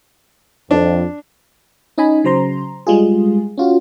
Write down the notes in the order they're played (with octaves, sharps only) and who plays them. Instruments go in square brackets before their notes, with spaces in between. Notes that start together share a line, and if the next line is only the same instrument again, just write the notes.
[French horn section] F2 [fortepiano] D4
[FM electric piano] C#4 D#4 D#5 G#5 B5
C#3 F#3 C5 A#5 C6
G3 G#3 F4 G#4
C#4 F4 F#4